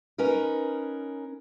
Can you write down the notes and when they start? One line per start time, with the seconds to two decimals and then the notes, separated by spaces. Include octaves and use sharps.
0.18 C#4 D#4 A#4 B4